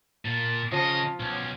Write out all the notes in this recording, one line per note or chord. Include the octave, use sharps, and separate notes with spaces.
A#2 A5
C#3 F3 D#5 A5 D#6
B1 C#4